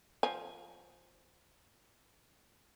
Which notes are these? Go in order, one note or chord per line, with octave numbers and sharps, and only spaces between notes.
F3 G#5